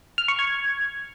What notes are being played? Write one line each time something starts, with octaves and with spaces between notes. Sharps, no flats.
F6
C#6
G#6